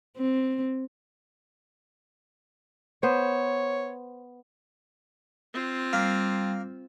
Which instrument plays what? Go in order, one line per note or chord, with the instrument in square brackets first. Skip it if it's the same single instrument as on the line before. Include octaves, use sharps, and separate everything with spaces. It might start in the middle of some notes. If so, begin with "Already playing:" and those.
[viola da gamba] C4
[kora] B3 C5 [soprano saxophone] C#5
[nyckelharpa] C4 F4
[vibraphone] G3 [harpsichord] A#3